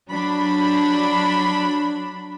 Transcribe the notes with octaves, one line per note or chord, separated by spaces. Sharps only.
F#3 D4 B5